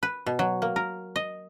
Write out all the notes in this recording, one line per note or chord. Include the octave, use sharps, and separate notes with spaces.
B4
B2
F#3
A#3
A#4
D#5